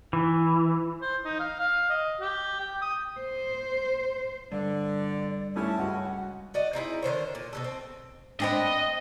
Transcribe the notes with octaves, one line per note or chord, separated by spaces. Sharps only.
E3
C5
D#4
F5
F5
D#5
G4
G5
D#6
C5
G2 D3 D5
A3 C#4 E4 G4 A5
C#2 F#4 F#5
F#4 D5 D#5
C4 D#4 E4 G#4
D3 D#3 C5 C#5
A#2
B2 E3 A4
C4
B3 C4 D4 D#5